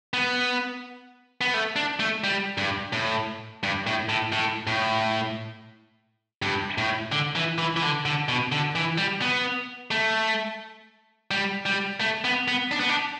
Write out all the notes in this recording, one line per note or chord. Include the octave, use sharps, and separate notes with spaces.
B3
B3
A3
D4
A3
G3
G2
A2
G2
A2
A2
A2
A2
G2
A2
D3
E3
E3
E3
D3
D3
B2
D3
E3
G3
B3
A3
G3
G3
A3
B3
B3
D4
B3
D4